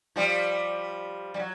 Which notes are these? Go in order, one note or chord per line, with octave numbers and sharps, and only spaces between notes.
F3 G3
G3
F#3